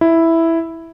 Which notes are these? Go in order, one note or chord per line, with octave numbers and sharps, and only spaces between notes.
E4